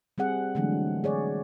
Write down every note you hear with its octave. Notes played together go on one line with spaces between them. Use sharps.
G3 C4 G#4 F#5
D3 E3 F#3 G#3 A3 D4
G#4 C#5 D5